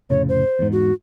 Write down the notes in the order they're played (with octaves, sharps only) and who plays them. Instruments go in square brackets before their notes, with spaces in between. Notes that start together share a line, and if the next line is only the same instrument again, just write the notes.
[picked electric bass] F1 A2 C#3 [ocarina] C#5
[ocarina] C5
[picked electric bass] E2 G#2
[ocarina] F#4